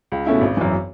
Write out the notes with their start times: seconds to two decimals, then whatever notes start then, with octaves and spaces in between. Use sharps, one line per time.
0.12 C#2
0.26 B2 A3 C#4 E4
0.41 G#1
0.57 F#2 E3